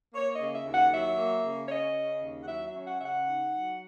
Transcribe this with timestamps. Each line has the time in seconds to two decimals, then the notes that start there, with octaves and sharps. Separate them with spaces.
0.14 A#3 C#5
0.34 D#5
0.40 C#3
0.53 E5
0.66 D#2
0.73 F#5
0.91 F#3 E5
1.17 A#3
1.44 C#3
1.65 C#5
1.70 C#4 D#5
1.96 C#3
2.21 D#2
2.43 F#5
2.47 F#3 E5
2.67 E5
2.73 C#4
2.87 F#5
2.98 C#3 E5
3.05 F#5
3.26 D#4
3.51 F#3